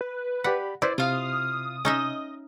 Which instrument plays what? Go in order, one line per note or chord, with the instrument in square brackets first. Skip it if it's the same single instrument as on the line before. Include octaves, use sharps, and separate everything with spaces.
[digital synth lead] B4
[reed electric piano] G4 D5 B5 [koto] F#5
[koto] E4 [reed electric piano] B4 C5 D6 [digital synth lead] D5
[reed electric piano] C3 [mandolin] F4 F5 [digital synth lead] D#6
[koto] C#4 D#4 E5 [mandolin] D#5